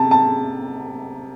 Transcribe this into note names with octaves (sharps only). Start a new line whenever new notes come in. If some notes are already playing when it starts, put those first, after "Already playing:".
Already playing: C3 A5
A5